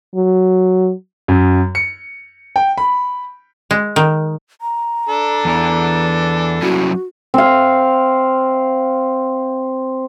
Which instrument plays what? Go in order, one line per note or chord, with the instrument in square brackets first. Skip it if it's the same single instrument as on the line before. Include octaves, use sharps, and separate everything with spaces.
[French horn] F#3
[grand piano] F#2
C#7
G5
B5
[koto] G#3
D#3
[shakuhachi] A#5
[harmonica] D4 A4
[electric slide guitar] E2 E3
[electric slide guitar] F#3 C#4 E4 [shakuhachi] F#4
[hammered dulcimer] C4 F5